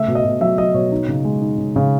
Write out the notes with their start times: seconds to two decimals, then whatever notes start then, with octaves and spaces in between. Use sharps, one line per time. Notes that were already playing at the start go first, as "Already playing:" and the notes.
Already playing: C#3 A3 E5
0.08 B2
0.15 D#5
0.25 B2
0.40 F#3 E5
0.58 F#3 D#5
0.74 B2 C#5
0.92 D#4
1.08 C#3
1.25 G#3
1.41 D#4
1.58 C#3
1.76 C#3